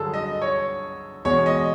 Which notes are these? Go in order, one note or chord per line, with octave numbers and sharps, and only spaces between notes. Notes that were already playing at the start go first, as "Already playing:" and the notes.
Already playing: G2 D3 F#3 G#4 A4
D#5
C#5
E2 B2 G#3 C#5
D#5